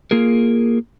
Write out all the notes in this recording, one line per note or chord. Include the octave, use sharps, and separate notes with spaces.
A#3 F4 G#4 A#4